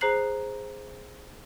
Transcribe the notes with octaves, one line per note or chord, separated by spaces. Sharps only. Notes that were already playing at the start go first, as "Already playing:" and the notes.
G#4 C5 A#5 F#6 C7 F#7